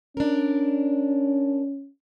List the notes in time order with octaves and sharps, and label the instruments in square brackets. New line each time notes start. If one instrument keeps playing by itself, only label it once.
[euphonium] C#4 [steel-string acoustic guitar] D4 A#4